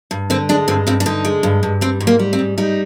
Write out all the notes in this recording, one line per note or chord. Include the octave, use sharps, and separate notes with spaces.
G2
D3 C4
G#3 D4
G2 C4
G2 C4
D4
D3 D#4
G#3
G2
G2
G3 C4
G#2
A#3
G3
C4
G#2
G3 D#4